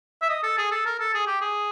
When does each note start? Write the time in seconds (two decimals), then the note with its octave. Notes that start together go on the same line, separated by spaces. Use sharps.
0.22 E5
0.29 D#5
0.43 A4
0.58 G#4
0.71 A4
0.86 A#4
0.99 A4
1.14 G#4
1.27 G4
1.41 G#4